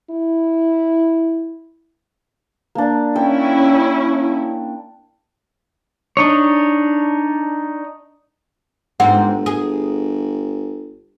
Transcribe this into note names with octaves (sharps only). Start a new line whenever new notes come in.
E4
A#3 D4
C#4 E4 G5
D4 D#4 C#5
G1 G#2 C4 F#5 A#5
G#4